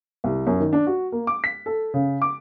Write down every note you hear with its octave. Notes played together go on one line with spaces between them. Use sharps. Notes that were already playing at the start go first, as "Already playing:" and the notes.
C2
F#2
D#3
D4
F#4
A#3
D6
B6
A4
C#3
D6